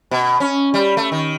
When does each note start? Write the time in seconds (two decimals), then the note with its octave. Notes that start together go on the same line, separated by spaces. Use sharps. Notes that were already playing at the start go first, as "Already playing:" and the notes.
0.11 B2
0.40 C#4
0.74 G3
0.97 A3
1.12 D#3